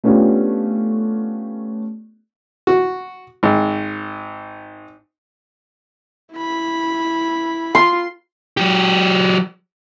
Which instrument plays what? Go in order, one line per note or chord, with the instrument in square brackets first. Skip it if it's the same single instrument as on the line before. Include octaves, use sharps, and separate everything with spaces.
[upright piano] A3 B3 C#4 D4 F4 G4
[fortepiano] F#4
G#1
[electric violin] E4 B5
[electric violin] F4 [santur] C6
[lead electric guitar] F#3 G4